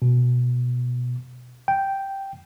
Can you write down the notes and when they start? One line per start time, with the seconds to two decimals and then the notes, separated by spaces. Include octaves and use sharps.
0.02 B2
1.68 G5